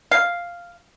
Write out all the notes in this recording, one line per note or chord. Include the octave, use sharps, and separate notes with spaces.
F5